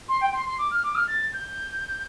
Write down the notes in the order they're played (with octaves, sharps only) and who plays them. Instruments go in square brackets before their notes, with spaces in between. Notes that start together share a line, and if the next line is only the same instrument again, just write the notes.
[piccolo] C6
G5
C6
C6
D6
F6
D6
F6
A6
G6